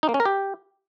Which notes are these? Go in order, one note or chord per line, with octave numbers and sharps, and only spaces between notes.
D#4
A#3
C#4
A#4
G4